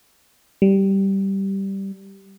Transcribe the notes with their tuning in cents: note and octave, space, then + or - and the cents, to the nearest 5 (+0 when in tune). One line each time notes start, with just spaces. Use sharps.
G3 -10